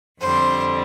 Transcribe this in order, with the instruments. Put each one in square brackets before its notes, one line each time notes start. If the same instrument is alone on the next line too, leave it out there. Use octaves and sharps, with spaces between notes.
[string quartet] F2 D3 G3 C5